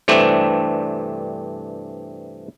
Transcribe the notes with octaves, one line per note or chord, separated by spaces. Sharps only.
G2 C3 E3 A3 C4 D4